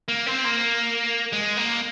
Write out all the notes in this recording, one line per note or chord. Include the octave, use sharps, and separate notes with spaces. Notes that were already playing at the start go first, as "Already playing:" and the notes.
A#3
C4
A#3
G#3
A#3